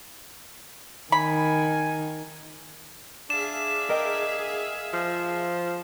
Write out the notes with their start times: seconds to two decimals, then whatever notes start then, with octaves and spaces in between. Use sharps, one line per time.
1.12 D#3 G#5 B5
3.30 D4 G#4 E5 F5 E7
3.89 A#4 D#5 G5
4.93 F3